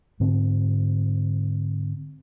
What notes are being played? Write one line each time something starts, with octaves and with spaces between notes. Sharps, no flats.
G#2 D3 C4